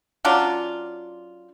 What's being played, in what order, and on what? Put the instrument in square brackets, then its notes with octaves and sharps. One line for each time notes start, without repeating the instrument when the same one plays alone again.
[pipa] F#3 C#4 D4 F4